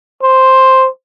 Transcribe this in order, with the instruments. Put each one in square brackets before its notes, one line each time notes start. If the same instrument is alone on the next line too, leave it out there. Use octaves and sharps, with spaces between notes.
[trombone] C5